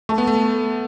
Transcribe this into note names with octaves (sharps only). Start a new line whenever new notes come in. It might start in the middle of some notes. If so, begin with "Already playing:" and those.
A3 A4 E5 A5 C#6
B3
A3